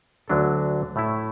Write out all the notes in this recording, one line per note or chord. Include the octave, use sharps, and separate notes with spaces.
D2 D3 F#3 D4 A4
A2 A3 E4